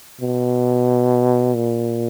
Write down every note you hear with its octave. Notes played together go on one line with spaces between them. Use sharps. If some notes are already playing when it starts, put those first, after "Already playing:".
B2
A#2